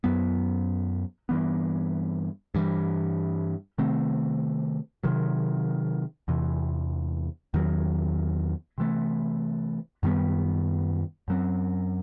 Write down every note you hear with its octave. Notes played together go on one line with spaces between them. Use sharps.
F#2 F#3 B3
G2 E3 B3
G2 E3 G3
C3 D#3 A3 C4
C3 D#3 F#3
E2 C3 E3
E2 D#3 F#3
C3 E3 A3
F#2 D#3 G3 B3
F#2 F#3 C4